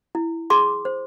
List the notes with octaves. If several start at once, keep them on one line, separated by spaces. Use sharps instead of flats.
E4
G#4 C6 D6
C5